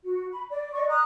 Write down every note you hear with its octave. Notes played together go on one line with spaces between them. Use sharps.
F#4
B5
D5
D5 D#5 C#6
A#5 D#6 F#6